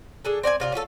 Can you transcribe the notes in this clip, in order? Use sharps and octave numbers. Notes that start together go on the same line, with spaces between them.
D4 G#4 A4
C4 D5 G5 G#5
C3 F4 D5
C#4 F4 G4 A4